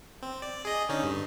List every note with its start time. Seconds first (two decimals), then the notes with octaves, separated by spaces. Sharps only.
0.22 C4
0.42 D5
0.65 G#4 D#5
0.89 D3 C#4 D#4
1.04 G2